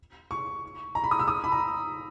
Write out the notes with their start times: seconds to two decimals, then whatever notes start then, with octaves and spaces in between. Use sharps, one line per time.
0.31 C#6
0.95 A#5
1.04 B5
1.11 D#6
1.19 E6
1.28 D#6
1.44 B5
1.52 A#5